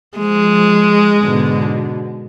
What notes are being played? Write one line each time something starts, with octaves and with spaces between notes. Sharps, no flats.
F3 G#3
G#2 B2 D3